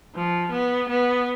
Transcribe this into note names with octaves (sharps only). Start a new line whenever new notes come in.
F3
B3
B3